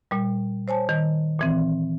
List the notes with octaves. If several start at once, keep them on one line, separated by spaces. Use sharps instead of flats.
A#2 G3
C5 C#5 G#5 A5
D#3
A#2 E3 C4